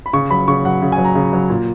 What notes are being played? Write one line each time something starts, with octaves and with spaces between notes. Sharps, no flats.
B5
C#3 C#6
F#3 B5
C#3 C#6
F#3 F#5
C#3
G#5
F#3
A#5
C#3
F#3
A#2